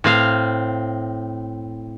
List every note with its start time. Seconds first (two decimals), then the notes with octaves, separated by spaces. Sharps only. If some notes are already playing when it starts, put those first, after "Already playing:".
0.04 A2 C4 F5